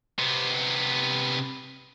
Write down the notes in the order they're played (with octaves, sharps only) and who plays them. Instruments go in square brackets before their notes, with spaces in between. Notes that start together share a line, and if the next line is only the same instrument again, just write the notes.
[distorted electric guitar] C3 B3